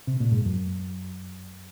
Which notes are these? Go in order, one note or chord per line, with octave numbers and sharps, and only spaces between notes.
C3
A#2
G#2
F#2